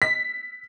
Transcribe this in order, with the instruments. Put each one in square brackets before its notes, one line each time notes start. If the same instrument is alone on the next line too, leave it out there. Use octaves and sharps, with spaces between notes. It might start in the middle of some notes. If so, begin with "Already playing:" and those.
[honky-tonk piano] B6